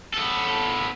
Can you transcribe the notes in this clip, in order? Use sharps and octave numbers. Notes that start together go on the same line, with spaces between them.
B3 A4